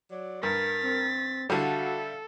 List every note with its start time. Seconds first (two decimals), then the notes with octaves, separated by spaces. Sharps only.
0.11 F#3 D5
0.43 G2 A#4 A6 B6
0.83 C4
1.50 D3 G3 F#4 A4 E5 F5